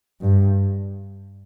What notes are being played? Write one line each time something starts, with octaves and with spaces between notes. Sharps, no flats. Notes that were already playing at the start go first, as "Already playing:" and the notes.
G2